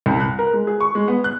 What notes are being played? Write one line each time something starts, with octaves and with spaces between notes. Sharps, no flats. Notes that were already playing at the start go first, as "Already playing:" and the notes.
C2
F#6
A#4
G#3
G#4
C#6
G#3
B3
F#6